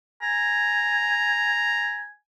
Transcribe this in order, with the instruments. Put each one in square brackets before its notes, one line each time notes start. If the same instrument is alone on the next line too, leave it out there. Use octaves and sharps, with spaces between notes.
[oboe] G#5 [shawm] A#5